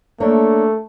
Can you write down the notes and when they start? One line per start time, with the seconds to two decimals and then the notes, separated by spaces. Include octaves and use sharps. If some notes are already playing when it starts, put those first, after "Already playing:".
0.20 A3 A#3 D4 C#5